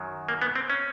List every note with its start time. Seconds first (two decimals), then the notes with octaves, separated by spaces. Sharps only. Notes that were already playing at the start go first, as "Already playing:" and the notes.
Already playing: F#2 D#3 F#3
0.29 A#3
0.42 B3
0.55 C4
0.70 C#4